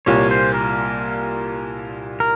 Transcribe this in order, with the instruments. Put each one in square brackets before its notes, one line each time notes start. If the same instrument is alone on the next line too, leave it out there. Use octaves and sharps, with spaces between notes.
[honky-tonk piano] C2 A#2 G3 A#3 F4 [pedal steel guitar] C#5
[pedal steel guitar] C5
A#4
A#4